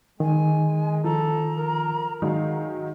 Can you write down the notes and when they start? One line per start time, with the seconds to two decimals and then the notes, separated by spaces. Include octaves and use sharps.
0.20 D#3 G#3 G#5
1.04 F3 A4 A#5
1.58 A#4
2.22 D#3 F#3 G#3 D#4 F5